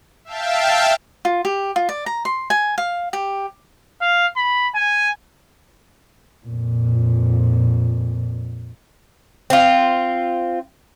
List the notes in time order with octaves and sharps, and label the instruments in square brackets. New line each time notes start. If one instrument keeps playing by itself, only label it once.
[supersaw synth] E5 F5 G5 A5
[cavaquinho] F4
G4
F4
D5
A#5
C6
G#5
F5
G4
[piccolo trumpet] F5
B5
G#5
[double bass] F2 A#2
[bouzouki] C4 F4